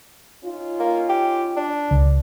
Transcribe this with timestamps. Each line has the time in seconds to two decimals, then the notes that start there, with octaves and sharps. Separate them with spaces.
0.44 C#4 D#4 F4
0.80 A#3
1.09 G4
1.57 D4
1.91 C#2